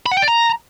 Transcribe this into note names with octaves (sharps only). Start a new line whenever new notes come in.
B5
F#5
G5
D5
A#5